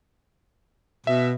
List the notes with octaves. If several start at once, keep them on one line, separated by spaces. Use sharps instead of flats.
B2 E5